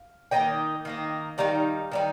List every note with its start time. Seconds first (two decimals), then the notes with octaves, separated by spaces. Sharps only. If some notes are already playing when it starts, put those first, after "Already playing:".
Already playing: F5
0.31 D#3 A#3 D#4 D#5 G5
0.85 D#3 A#3 D#4
1.38 D#3 G3 D#4 F5 A#5
1.91 D#3 G3 D#4